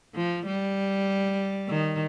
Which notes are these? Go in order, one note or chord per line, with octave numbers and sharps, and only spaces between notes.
F3
G3
D#3